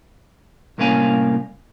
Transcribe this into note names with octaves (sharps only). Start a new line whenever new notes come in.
C2 A2 A#3 C#4 F5 G#5